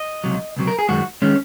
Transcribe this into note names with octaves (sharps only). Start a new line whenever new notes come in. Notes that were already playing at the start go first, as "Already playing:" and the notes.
Already playing: D#5
C#2 C3 F#3
C#2 C3 F#3
A#4
G#4
F#2 D#3 G#3 F#4
D#3 G#3 C#4